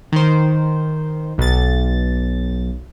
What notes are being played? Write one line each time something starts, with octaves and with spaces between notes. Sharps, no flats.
D#3 C5
B1 A6